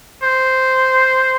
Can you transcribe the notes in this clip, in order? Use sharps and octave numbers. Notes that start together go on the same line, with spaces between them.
C5